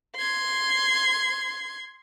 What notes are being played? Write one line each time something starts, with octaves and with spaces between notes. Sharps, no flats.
C6 G#6